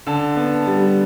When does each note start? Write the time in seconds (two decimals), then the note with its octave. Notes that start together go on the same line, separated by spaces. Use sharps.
0.07 D3 A5
0.36 B3
0.67 G3